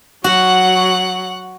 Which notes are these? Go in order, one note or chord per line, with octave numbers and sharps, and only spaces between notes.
F#3 F#4 F#5 F#6